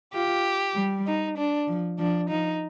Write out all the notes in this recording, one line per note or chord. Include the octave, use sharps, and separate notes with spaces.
F4 G4
G3
D#4
D4
F3
F3 D4
F3 D#4